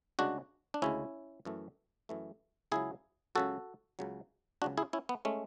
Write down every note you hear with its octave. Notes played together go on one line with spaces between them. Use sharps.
D2 C#3 G#3 D4 F#4
D4
D2 C#3 G#3 C#4 E4
F#2 E3 A3
F#2 E3 A3
C#2 C#3 F#3 E4 G#4
C#2 C#3 F#3 F#4 A4
C#2 C#3 F#3
C#2 C#3 F#3 D4 F#4
E4 G#4
C#4 E4
B3
G#3 A3 C#4